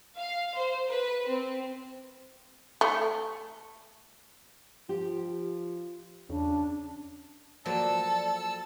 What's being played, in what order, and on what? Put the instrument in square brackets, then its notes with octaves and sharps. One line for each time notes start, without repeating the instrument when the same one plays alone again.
[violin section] F5
C5
B4
C4
[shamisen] A3
[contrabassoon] F3 [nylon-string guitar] G4
[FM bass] E2 [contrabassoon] C#3 [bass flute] D4
[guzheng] F3 F#3 A#3 [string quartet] A4 [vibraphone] D5 [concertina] A5 E6